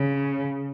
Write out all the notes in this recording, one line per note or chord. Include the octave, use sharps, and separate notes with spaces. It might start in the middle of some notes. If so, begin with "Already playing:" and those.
Already playing: C#3